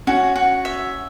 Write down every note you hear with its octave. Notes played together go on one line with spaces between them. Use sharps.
C#4 F#4
F#4
E5